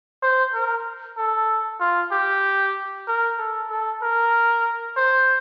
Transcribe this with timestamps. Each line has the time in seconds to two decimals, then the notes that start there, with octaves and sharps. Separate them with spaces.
0.23 C5
0.54 A#4
1.17 A4
1.80 F4
2.11 G4
3.08 A#4
3.38 A4
3.70 A4
4.02 A#4
4.96 C5